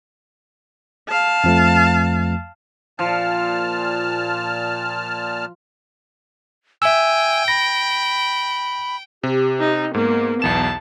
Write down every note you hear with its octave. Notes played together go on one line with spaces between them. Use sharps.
F5 A5
F2 F3 A3
A#2 F3 A5 F6
E5 G5 G#5 E6
B5 A#6
C3 G4
D#4
G#2 A#3 B3
B1 E2 A5 E7